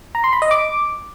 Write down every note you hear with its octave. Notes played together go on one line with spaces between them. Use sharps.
A#5
C6
B5
D#5
D6